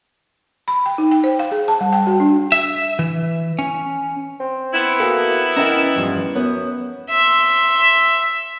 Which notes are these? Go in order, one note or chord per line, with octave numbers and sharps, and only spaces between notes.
B5
G5
D#4
G5
C5
F5
G#4
A5
G3
G5
F#4
D4
E5
E3
C#4
C4
B3 E4
A#3 F#4 A4
E3 C#4 A#4 D#5 F#5 A#5
E2 G2 F3
F#2 B3 C#5
E5 C6